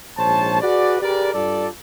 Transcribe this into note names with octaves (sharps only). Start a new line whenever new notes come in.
A#1 G#2 C5 C#5 A5
F#4 G#4 B4 D5
G4 G#4 A#4 B4 D5
G2 F4 A4 D5